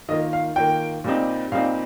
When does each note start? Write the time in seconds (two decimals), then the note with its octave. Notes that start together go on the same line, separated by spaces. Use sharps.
0.09 D#3 A#3 F4 D#5
0.33 F5
0.56 D#3 A#3 F4 G5
1.04 A#2 G3 C4 D#4
1.52 A#2 G3 C4 D#4 F5